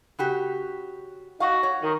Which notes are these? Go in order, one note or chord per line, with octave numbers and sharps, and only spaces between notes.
C#3 F#4 G4
D#4 F#4 F5
C#5
D#3